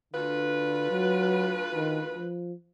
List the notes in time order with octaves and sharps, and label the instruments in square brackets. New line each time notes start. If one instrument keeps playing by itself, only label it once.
[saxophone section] D2 F4 B4 [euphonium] D3
[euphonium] F#3
D#3
F3